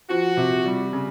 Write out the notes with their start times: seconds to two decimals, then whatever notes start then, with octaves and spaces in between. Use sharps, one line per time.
0.10 F3 F#4
0.37 C3
0.66 G3
0.93 C#3